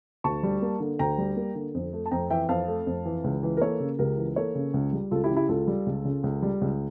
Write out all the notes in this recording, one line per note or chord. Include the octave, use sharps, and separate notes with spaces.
D2 A5 C#6
G3
A#3
D3
D2 G5 A#5
G3
A#3
D3
F2
A3
A5
F2 G5 A#5
E3 E5 G5
F2 F5 A5
A3
F2
E3
C#2
E3
A#4
A#3 A4 C#5
C#3
C#2 G4 A#4
E3
A#3 A4 C#5
C#3
C#2
G3
C#2 F4 A4
E4 G4
C#3
E4 G4
C#2 F4 A4
G3
C#2
C#3
C#2
G3
C#2